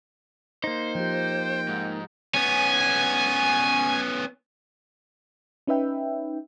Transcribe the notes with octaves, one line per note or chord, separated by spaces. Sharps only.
A#3 D#4 C5
F3 G4 G5
G#2
B3 C#4 G#5
C#4 D#4 B4 E5 G5